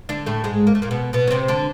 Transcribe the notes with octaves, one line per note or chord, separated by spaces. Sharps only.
D3 D4
A2 A3
G#2 G#3
A#3
A3
A#2 A#3
B2 B3
B2 B3
C#4
C3 C4
D3 D4